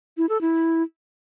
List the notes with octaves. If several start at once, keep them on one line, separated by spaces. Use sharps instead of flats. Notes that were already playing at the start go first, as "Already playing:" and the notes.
E4
A4
E4